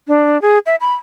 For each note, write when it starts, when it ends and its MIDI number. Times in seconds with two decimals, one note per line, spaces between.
0.08 0.40 62
0.42 0.58 68
0.66 0.76 76
0.81 0.94 83